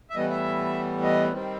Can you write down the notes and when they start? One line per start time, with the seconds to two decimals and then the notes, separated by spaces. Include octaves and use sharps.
0.10 E5
0.15 A2 E3 G3 B3 D#5
0.30 E5
1.03 D#5
1.32 D#3 G3 C4